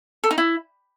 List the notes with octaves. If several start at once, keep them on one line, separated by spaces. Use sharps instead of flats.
A4
D#4
E4